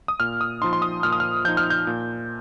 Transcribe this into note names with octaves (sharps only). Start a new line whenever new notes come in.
D#6
A#2 F6
D#6
F3 D#4 C6
C6
D#6
A#2 F6
D#6
F6
F3 D#4 G6
F6
G6
A#2